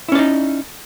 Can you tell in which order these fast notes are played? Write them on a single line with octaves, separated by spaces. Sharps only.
E4 C#4 D5 D#4